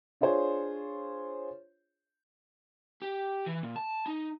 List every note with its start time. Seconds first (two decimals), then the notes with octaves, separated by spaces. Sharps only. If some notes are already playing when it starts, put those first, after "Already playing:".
0.21 D4 F4 G#4 C5 C#5
3.02 G4
3.46 E3
3.63 A#2
3.76 A5
4.06 D#4